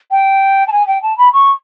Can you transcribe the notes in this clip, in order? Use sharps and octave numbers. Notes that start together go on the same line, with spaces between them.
G5
A5
G#5
G5
A5
B5
C#6